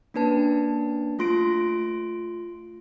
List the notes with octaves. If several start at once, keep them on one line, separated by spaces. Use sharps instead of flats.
A#3 C#4 D4 B4 A5
A3 F4 C6 A#6 D7